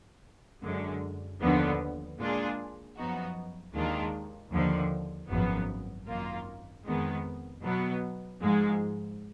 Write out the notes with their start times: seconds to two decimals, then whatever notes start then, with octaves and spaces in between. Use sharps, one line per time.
0.62 F#2 D3 G#3
1.41 D#2 D3 F3 B3
2.18 A#2 G#3 D4 F4 G#4
2.96 F#2 F3 B3 D#4 F#4
3.74 D#2 D#3 G#3 D4 F4
4.51 D#2 D3 F3
5.29 G#1 F#2 F3 B3
6.07 G#1 F#2 D#3 A#3 F4
6.85 F2 D#3 G#3 B3
7.63 B2 F#3 B3
8.40 G#2 F3 G#3